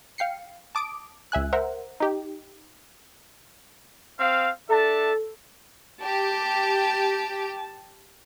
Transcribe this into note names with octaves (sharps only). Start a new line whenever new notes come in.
F5 G5 C7 C#7
A5 D6 D#6 D7
C#2 E5 G#5 F#6
A#4 C5 E5 F#5
D#4 G4
C4 F5
D4 A4 E5 A5
G4 A5